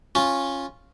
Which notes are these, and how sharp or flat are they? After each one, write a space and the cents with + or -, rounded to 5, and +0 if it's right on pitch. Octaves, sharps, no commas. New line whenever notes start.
C#4 -10 F4 +0